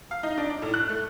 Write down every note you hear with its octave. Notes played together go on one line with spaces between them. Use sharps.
F5
D#4
D4
D5
A2
F#6
A3